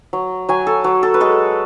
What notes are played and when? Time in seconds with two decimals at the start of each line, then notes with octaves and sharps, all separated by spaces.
0.13 F#3
0.49 F#3 G#5
0.67 A4
0.84 F#3
1.03 A4
1.14 B4
1.20 G#3 A4